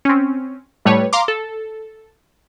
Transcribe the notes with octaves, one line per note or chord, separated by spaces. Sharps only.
C4 C#4
A2 G3 A3 B4 C#5
F5 A#5 C6 D6
A4